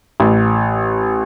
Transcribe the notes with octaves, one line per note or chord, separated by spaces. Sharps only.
A1